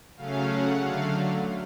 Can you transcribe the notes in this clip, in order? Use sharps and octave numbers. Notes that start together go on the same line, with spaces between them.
C#3 F#3 A3 C#4 F5
F#5
D3 F#3 A3 F5